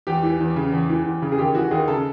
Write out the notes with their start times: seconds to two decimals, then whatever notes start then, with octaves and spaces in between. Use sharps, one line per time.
0.07 E2 G4
0.23 E3
0.40 E2
0.56 C#3
0.72 E2
0.89 E3
1.05 E2
1.22 C#3
1.32 G#4
1.38 D#2 G4
1.55 E3 F#4
1.71 D#2 G#4
1.88 C#3 A4